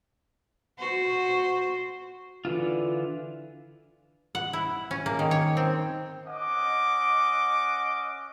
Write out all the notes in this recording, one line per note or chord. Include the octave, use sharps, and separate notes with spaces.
F#4 C5
D3 E3 F4
F#5
E4
C#4
A#3
D#3
C#5
C4
C#4 D#5 F#5 D6